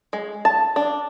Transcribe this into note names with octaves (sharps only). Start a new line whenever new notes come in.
G#3
A5
D4